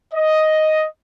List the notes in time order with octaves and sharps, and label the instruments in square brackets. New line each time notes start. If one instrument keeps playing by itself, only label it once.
[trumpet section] D#5